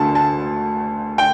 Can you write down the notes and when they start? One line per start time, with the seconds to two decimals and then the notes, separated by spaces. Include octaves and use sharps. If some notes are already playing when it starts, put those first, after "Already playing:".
Already playing: D2 D3 A3 A5
0.15 A5
1.18 G5